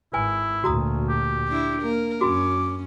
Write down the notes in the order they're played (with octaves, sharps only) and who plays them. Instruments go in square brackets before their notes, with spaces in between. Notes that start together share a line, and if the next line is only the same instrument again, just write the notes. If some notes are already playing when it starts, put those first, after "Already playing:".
[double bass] G#1 [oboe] E4 [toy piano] B4 G#5
[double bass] D2 A#2 [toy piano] F#4 A#5 D#6
[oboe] G4
[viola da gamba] D4 E4
[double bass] A#3 [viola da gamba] A#4
[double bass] F#2 [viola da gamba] C#4 [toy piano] F#4 B5 [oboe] D6